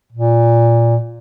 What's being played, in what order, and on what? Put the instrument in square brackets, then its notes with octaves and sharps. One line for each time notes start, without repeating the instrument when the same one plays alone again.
[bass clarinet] A#2